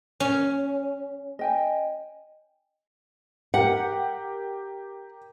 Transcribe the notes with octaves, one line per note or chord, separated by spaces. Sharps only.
C#4
D#5 G5 G#5
G4 A#4 F#5